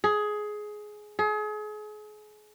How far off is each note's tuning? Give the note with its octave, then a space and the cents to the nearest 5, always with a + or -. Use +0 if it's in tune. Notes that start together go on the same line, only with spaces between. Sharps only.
G#4 +15
G#4 +35